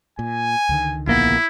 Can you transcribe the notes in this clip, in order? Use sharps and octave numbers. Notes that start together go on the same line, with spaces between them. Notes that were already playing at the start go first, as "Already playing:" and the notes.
A#2 G#5
C#2 D3 D#3
A#1 A#3 B3 E4